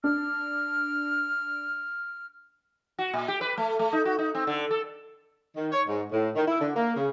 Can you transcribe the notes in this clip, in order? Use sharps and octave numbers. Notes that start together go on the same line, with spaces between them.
D4 F6
F#4
A#2
G4
B4
A3
A3
D#4
F#4
D#4
C4
D3
A4
D#3
C#5
G#2
A2
D#3
E4
D3
A#3
C#3